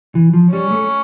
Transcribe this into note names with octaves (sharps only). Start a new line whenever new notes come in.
E3
F3
G3 C#4
A3